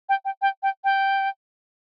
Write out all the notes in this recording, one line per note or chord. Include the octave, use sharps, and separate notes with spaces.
G5
G5
G5
G5
G5